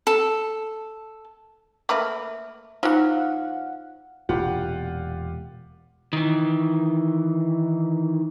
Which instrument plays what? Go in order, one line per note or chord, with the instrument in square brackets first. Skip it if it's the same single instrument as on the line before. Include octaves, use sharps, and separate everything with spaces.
[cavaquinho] A4
[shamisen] A3 A#3 B4 [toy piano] E5 D6
[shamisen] E3 F#3 [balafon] D#4 [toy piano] F4 C5 [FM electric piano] F5 F#5
[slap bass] E1 A#2 [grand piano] F4 G4 F#5
[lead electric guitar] D#3 E3